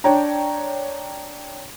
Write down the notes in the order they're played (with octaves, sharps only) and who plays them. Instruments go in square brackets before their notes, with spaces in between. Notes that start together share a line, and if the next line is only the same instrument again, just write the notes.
[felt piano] D4 C#5 G5 A#5